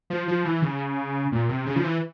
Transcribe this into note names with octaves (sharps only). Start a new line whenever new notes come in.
F3
F3
E3
C#3
A#2
C3
C#3
F3
E3